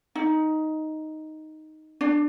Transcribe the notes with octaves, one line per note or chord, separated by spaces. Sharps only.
D#4
D4